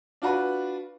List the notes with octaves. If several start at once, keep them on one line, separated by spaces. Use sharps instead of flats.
D4 F4 F#4 B4